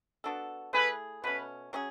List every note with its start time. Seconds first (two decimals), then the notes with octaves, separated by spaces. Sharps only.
0.24 B3 D4 F#4 A4
0.73 A3 E4 G#4 B4
1.23 B2 A3 C#4 B4
1.73 F#3 C#4 G#4